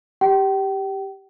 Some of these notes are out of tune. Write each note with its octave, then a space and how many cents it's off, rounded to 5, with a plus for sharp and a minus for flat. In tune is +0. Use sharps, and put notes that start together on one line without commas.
G4 +0 G5 -35